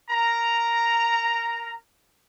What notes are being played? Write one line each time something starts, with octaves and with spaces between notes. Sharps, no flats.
A#4 A#5